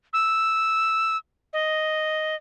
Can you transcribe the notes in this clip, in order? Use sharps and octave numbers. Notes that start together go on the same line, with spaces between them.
E6
D#5